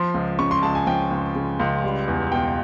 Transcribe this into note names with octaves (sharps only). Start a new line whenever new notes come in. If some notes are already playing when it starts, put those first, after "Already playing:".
Already playing: F3 C6
C#2
C#3 C#6
C6
C#2 A5
G#5
F3 G5
C#2
C#3
C#2
G3
E2
B2 G5